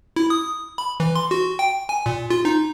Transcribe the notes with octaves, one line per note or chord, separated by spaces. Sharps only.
E4
D#6
B5
E3
C6
F#4
G5
G#5
A#2
F4
D#4